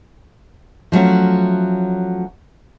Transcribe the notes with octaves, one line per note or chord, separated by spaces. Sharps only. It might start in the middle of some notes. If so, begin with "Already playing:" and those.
F3 F#3 A3 C#4